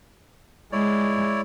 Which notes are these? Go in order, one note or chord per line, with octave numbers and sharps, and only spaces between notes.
G#3 E4 C#5 D5